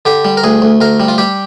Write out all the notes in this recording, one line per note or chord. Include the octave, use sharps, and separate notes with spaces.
D3 G4
G3
A#4
D2 G#4
D2
D2 A#4
G3
F4
G3 G4